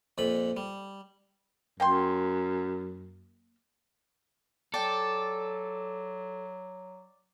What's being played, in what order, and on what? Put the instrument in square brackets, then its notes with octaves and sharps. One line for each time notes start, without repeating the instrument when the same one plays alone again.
[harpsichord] F2 A#2 B5
G3
[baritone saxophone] F#2 [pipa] A#3 G5 C6
[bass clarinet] F#3 [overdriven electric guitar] A4 [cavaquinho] D5 G5